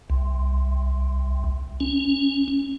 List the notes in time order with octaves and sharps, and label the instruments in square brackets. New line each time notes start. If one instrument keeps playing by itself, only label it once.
[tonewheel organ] C2
C#4